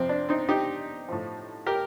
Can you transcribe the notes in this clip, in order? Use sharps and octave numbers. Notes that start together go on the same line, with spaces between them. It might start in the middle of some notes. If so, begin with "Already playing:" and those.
Already playing: F2 C3 F3 C4
D4
C4 D#4
D#4 G4
A2 F3
G4 A#4